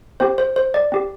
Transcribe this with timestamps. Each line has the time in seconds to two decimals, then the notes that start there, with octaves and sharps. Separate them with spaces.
0.20 C4 G4 C5
0.38 C5
0.56 C5
0.74 D5
0.92 C4 G4